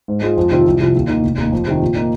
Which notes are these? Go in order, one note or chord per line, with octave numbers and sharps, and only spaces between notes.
G#2
G#3 F4
F2
C3 D#3 C4 F4
C2
C3 F3
D#2
D#3 A#3 D#4
F1
D#2 D#3 A#3 D#4
F2
C3 D#3
A#2
A#3 D#4